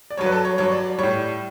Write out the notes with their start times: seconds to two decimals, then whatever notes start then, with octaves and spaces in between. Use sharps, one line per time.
0.11 D5
0.17 G2 F#3 C#5
0.26 B4
0.32 A4
0.45 C#5
0.58 G2 F#3 C#5
0.72 D5
0.98 A2 G3 C#5